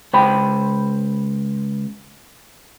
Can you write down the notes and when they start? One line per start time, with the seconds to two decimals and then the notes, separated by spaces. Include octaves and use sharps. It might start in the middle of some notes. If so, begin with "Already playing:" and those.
0.13 C#2 C5 G5 B5